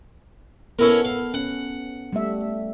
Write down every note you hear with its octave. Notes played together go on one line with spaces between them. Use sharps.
B3 C#4 E4 A4 A#4
F5
C#4 F#5
G3 A3 E5